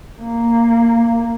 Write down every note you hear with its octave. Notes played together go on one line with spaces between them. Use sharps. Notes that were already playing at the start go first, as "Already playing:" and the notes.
A#3